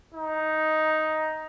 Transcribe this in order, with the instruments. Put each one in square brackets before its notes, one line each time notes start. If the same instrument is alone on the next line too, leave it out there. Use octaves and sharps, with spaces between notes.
[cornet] D#4